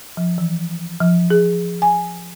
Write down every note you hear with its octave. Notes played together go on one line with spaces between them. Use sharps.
F3
E3
F3
G#4
G#5